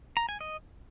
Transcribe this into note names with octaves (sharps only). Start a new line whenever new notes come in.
A#5
G#5
D#5